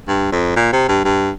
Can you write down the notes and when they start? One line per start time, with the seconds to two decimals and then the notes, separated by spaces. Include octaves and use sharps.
0.08 G2
0.32 F2
0.56 A#2
0.72 C3
0.88 G2
1.05 G2